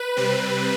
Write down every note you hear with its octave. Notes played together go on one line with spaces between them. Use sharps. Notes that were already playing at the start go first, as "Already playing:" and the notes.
Already playing: B4
C3 G3 C4